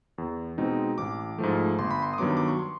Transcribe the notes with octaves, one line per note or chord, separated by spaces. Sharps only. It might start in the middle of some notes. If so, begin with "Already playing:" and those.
E2
B2 G#3 C4 D#4
A1 D6
G#2 F3 A3
G1 C6
B5
C6
D#6
G2 D#3 F#3 B3 D6
D6
C#6
C6